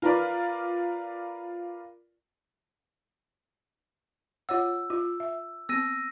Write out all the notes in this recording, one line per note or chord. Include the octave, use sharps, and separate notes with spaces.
F4 A#4 B4 D5
F4 C#5 F#5 E6
F4
E5
B3 C4 E6 A#6 D#7